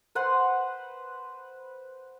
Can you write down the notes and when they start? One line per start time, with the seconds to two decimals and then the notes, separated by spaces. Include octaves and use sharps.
0.15 B4 C5 F#5 C6